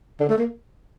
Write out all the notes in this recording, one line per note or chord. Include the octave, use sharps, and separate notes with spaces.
D3
A3
A#3